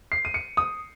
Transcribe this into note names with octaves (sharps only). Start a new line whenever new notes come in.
C7
D#7
C#7
D#6